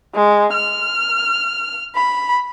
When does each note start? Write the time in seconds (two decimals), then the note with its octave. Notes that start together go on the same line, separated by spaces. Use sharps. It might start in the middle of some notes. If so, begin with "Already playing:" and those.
0.15 G#3
0.53 F6
1.96 B5